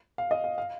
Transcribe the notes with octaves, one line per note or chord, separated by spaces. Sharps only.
F5
D#5
F5
F5